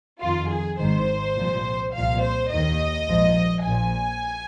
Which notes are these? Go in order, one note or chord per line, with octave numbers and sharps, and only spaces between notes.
F2 D#3 F4
G#4
G#1 G#2 D#3 C5
C2 A#2 F3
C2 A#2 F3 F5
C5
D#2 D#3 D#5
A#1 G#2 F3
A#1 A#2 F3 G#5